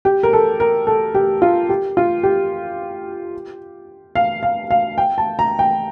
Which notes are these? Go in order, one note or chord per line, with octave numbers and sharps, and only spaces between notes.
G4
A#4
A4
A#4
A4
G4
F4
G4
F4
G4
F5
F5
F5
G5
A5
A#5
G5